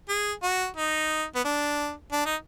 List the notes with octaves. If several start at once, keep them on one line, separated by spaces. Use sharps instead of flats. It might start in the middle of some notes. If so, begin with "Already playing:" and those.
G#4
F#4
D#4
B3
D4
D4
D#4